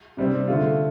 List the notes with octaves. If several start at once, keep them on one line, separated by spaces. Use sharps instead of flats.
C3 G3 C4
D3 A3 F4